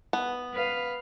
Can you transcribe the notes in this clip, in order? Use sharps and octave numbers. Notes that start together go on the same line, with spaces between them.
B3
B4 F5